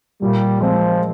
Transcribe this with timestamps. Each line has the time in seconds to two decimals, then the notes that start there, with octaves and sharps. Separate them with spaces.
0.22 A#2 G3
0.61 F3 G#3 C4